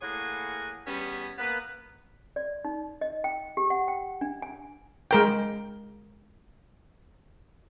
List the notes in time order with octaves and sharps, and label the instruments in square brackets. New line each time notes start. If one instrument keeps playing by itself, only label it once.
[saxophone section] A2 E3 A#3 G#4 C#5 F#5
E2 G3 B3 C#4
A#3 B3 B4
[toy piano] D5
D#4
D#5
G5
G4
F#5
G5
D4
G#5
[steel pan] G#3 A#4 G5